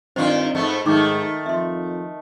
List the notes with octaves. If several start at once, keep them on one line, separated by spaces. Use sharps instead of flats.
G2 D#3 C4 F4 C5 C6
G#2 A3 B3
G#2 D#3 A3 D#4 C#6 D6
F2 E5 C6